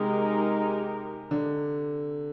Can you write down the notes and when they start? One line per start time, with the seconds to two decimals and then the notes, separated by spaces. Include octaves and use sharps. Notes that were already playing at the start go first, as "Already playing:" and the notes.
Already playing: C3 G#3 D#4 G4 A#4
1.31 D3